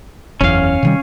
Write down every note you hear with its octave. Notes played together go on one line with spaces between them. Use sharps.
F#1 E2 C#4 F5
C3 D#3 G3